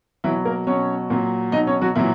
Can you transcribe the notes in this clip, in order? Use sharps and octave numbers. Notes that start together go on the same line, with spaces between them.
B2 E3 F#3 E4
A#3 A#4
B2 F#3 C#4 C#5
A#2 F#3
B2 F#3 D#4 D#5
C#4 C#5
F#3 F#4
A#2 E3 F#3 E4